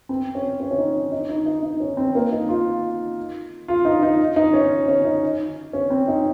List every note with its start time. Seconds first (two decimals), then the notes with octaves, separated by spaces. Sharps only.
0.09 C4
0.35 C#4
0.60 C#4
0.71 C#4
0.78 D#4
1.12 D#4
1.29 D#4
1.46 D#4
1.63 D#4
1.80 C#4
1.97 C4
2.15 A#3
2.32 D#4
2.49 F4
3.68 F4
3.85 D#4
4.03 D#4
4.36 D#4
4.53 C#4
4.88 C#4
5.05 D#4
5.73 C#4
5.90 C4
6.08 D#4